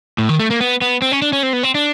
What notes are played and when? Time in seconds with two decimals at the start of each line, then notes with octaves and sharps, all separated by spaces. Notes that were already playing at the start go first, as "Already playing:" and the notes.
0.18 A2
0.29 D#3
0.39 A3
0.50 A#3
0.61 B3
0.81 B3
1.02 C4
1.12 C#4
1.22 D4
1.33 C#4
1.43 C4
1.53 B3
1.63 C4
1.75 D4